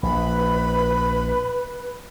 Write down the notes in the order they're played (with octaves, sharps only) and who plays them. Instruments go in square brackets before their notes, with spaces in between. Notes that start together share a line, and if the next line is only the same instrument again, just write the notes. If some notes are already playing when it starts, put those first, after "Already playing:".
[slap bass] A#1 [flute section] B4 [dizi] B5